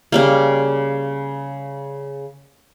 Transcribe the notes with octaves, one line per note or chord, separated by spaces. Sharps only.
C#3 G3 A#3